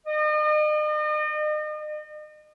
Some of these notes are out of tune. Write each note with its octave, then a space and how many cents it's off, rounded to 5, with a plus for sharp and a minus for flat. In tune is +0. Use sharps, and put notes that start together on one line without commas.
D#5 -40